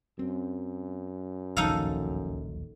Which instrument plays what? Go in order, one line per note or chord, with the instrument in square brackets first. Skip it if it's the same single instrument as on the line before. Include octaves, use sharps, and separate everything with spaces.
[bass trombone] F#2 [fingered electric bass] C4
[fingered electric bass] D1 A#1 D#2 [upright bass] C#3 F3 [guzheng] D#4 A4 F5